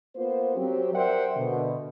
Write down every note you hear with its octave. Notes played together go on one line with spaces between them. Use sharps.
A#3 B3 F4 C5
F#3 C4 G4
A#4 C5 D5 E5 F#5 G5
B2 D3